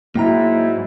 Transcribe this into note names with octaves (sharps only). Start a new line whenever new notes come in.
G#2 F#3 A#3 E4 G5 A#5